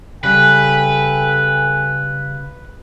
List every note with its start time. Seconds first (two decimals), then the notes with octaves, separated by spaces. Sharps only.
0.24 C#3 G3 A4 B4 G5 G#5